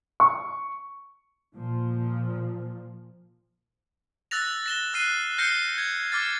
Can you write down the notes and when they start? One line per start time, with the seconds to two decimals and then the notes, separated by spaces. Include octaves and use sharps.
0.20 C#6
1.54 A#2 F3
4.31 E6 F#6 A6 A#6 F7
4.66 A#6 E7 G7
4.94 F6 F#6 C7 D#7
5.38 F6 G6 A#6 C7 C#7
5.78 G#6
6.12 D6 F6 A6